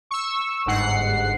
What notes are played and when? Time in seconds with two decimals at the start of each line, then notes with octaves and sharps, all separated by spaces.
0.11 C#6 E6
0.66 G1 G#2 F#5 C7